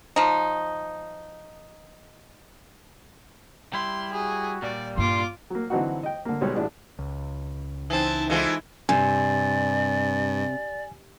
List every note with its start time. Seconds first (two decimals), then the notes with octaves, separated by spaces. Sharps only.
0.16 F3 D#4
3.73 G3 E4 C6
4.13 F#4 G#4
4.62 A#2 G3 D5
4.97 G2 A#3 F4 C6 D6
5.50 F#3 A#3
5.70 D3 E3 F#3 C4 D#4 F#4
6.03 D#5 G5
6.25 D3 A#3
6.41 B1 G3 G#3 C#5
6.55 A1 D4 F#4 G#4
6.99 C#2
7.90 E3 C4 D#4 A5
8.30 E3 G#3 A3 E4 F4
8.89 G2 C3 D5 G#5